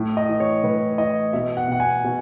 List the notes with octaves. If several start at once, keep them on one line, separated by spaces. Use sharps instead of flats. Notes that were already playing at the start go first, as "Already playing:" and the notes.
Already playing: A2
D#5
E3
C#5
A2 B4
E3 D#5
B2 E5
F#5
B2 F#5
G#5
B2